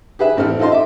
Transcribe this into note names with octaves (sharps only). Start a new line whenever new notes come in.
G4 G#4 B4 E5
A1 A3 C4 G4 F6
D#4 F4 A4 D#5 C6
E5 D6